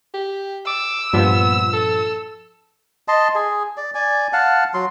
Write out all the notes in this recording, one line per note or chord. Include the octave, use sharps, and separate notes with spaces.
G4
D6 E6
G2 A#2 F3 B3
A4
D#5 A5 C6
G#4
D5
D5 G#5
F5 F#5 A5
F#3 C6